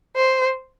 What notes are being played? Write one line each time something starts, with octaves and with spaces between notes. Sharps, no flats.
C5